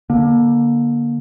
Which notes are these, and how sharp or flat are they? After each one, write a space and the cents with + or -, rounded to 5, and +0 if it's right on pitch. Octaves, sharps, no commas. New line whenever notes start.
D3 +0 A#3 +25